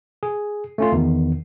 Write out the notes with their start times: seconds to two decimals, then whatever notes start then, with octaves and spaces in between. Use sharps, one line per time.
0.23 G#4
0.78 A3 C#4 F4
0.92 E2 D#3